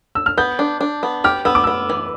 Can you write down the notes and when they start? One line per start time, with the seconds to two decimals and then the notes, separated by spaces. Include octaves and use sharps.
0.15 E6
0.26 F6
0.38 B3 G6
0.59 D4
0.81 D4
1.03 B3
1.24 G4 F6
1.45 B3 E6
1.55 D6
1.64 B3 E6
1.90 E3